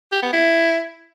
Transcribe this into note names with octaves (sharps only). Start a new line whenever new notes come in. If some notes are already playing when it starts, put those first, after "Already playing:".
G4
B3
E4